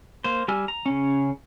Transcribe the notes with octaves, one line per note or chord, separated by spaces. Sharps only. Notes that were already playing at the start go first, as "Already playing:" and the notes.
A#3 C5
G3 G4 G#5 E6 F6
A#5
C#3 C#4